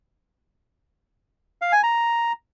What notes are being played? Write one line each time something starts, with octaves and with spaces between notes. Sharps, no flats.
F5
G#5
A#5